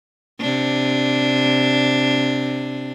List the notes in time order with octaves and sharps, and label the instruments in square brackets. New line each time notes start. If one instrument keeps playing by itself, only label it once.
[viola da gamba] C3 D4